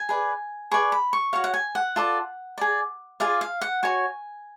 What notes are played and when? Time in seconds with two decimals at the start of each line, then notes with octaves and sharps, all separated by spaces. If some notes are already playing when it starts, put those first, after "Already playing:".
Already playing: G#5
0.09 G#4 B4 D5
0.71 G#4 B4 D5 C#6
0.92 B5
1.13 C#6
1.33 F#4 C#5 F5
1.44 F#5
1.54 G#5
1.75 F#5
1.96 F4 A4 D5
2.58 G#4 D5
3.20 F4 G#4 D5 F5
3.41 F5
3.61 F#5
3.83 F#4 C#5 G#5